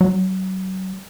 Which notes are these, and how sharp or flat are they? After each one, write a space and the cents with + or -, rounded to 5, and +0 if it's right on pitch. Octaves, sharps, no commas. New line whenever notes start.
F#3 +30